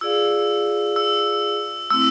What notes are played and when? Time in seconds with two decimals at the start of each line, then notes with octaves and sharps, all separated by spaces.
0.01 F4 G#4 D5 F5 E6
0.96 E6
1.90 A3 C4 E4 E6